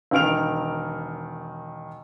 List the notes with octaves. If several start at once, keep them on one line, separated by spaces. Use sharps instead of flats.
E1 D#3 F6 D7 F7